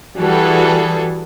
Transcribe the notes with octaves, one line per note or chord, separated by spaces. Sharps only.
E3 G3 F#4 G#4 A4 B4